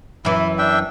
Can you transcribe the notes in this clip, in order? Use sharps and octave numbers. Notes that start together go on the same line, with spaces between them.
F#2 E3 E4
D4 E5 G5